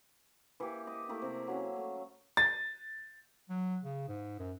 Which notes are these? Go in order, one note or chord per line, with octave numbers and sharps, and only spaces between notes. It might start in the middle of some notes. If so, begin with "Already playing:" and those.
E3 A#3 E4 G4
D#5 D6
A3 A#3 E4 G4
C3 A#5
F#3 C#4 F5
A3
A6
F#3
C#3
G#2
F#2